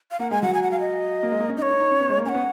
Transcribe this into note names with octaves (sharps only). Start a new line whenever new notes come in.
F5
A#3 F#5
G#3 G#5
F#3 F#5
G#5
F#5
F5
D#5
A#3
G#3
A#3
C#4
D#4 D#5
C#5
D#4
D#4
C#4
B3
G#3
A#3
C#4 F#5 G#5
B3